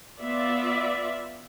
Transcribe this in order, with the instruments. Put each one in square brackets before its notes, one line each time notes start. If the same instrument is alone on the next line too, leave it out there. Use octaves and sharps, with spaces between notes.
[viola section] B3 F4 D5 E5